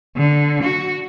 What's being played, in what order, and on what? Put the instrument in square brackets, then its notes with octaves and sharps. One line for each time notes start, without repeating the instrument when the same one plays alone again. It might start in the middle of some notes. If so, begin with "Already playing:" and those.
[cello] D3
F#4